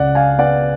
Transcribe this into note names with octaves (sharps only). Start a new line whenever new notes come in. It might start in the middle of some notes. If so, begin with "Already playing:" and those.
Already playing: C#2 C#3 D5 F#5
F5 G#5
B3 D5 F#5